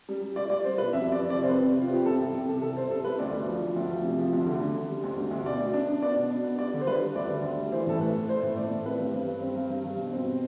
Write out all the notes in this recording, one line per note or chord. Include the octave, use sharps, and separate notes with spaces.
G3
G3
G3 D5
G3 D5
G3 C5
B2 B4
F2 E5
G3
D5
F2
D5
C3
C5
C4 B4
C3
C3 F4
C4 G4
C2 A4
C2 G4
C3 G4
C3 A4
C2 A4
C3 C5
C2 A4
G3 B4
D2 D5
D2
F3
F3
D2
F3
C3
F3
D2
D3
D3
D3
G3
D2
D2
D2
B2 D5
B3
D4
D4
B3 D5
B2
D4
B3
G3 D5
D3
C5
G3 B4
G3
D2 D5
D3
D2
G3
E3 C5
A2 A4
A3 B4
A3
A3 C5
A2
A3 D5
A2
C4 B4
G2
G2
G2
C4
G2
G2
G2
B2
C4
B2